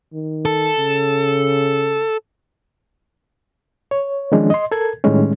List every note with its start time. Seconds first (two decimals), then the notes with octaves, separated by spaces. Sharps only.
0.13 D#3
0.45 A4
0.79 C#3
3.91 C#5
4.32 D#3 F3 G#3 C#4 D4
4.50 D#5 C6
4.72 A4 A#4 G#6
5.04 A2 D#3 G3 G#3 C#4